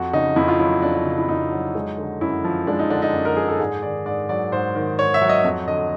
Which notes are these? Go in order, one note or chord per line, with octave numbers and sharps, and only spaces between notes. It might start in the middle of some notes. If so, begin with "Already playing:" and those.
Already playing: F2 F#4
C#3 D#4
F2 E4
F4
F#3 E4
F2 D4
D4
C#3
E4
F2 D#4
F#3
G#3
D3
F#2 E4
F3
G#3 D4
D#4
D3 D4
D#4
F#2
A#4
F3 G#4
A4
G#2 G#4
D#3 D5
G#2 D5
F#3 D5
G#2 C5
D#3
G#2 C#5
E5
F#3
D#5
F2
D3 D#5